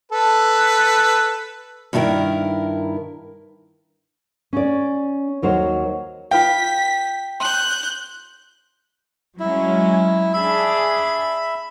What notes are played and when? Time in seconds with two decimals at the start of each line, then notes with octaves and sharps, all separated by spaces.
0.12 A4 B4
1.93 G2 D#3 E4 G#4 A#4
4.53 C#4 D5
5.42 D#2 F#3 A#4 C5
6.31 F4 B4 F5 G5 B6
7.40 C6 F#6 G6
9.40 F#3 G#3 C#4 E4
10.33 D4 G#4 E5 B5